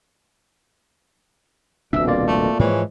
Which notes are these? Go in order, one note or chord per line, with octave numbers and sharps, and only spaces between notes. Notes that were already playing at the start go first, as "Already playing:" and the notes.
D#1 C2 F2 B2 D4 E5 E6
A#3 F4 D5
A3
G#2 E3 F3 G#3 C#5